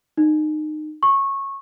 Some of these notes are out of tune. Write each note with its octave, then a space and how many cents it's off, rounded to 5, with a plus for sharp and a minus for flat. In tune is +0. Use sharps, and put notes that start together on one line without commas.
D#4 -25
C#6 -15